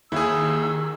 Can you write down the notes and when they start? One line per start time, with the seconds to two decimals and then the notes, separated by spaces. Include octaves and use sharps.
0.12 D#2 D#3 E4 G#4 E6